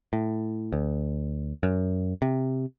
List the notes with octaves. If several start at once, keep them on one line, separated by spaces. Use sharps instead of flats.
A2
D2
F#2
C3